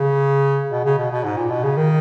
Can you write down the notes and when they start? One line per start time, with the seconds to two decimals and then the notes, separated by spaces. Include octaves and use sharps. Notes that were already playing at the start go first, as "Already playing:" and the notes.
Already playing: C#3
0.71 B2
0.85 C#3
0.98 B2
1.11 B2
1.24 G#2
1.37 A#2
1.50 B2
1.63 C#3
1.77 D#3